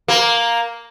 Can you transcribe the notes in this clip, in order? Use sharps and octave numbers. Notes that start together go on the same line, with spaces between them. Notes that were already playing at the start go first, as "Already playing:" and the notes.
A#3 A#4